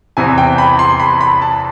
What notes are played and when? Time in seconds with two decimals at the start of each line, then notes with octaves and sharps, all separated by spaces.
0.17 E2 C3 E3 G#5
0.38 G5
0.58 B5
0.79 C6
1.00 B5
1.21 B5
1.42 A5